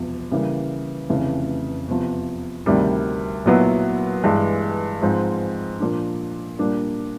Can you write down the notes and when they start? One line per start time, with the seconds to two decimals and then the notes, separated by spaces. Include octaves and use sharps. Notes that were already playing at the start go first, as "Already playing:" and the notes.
Already playing: E1 E2 C3 F3
0.31 C#3 E3 G3 A#3
1.09 F1 F2 C#3 E3 A3
1.88 E2 C3 F3
2.66 D2 C3 D#3 G3
3.46 B1 A#2 F#3 B3 E4
4.24 G2 E3 G#3
5.02 G#2 F3 G#3 C4
5.80 A#2 F3 A#3 D4
6.59 A#2 G3 A#3 D4